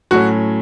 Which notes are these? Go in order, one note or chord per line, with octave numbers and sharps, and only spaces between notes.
A2 F#3 A3 C#4 F#4